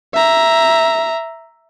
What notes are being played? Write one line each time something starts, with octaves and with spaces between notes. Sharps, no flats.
E5 A#5